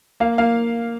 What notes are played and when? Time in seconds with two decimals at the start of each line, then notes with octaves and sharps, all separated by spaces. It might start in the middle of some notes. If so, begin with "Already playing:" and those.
0.20 A#3 F5
0.38 A#3 F5